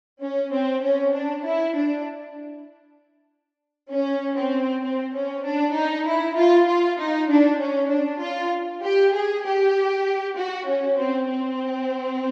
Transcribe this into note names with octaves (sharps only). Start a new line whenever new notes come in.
C#4
C4
C#4
D4
E4
D4
C#4
C4
C4
C#4
D4
D#4
E4
F4
F4
D#4
D4
C#4
D4
F4
G4
G#4
G4
F#4
C#4
C4
C4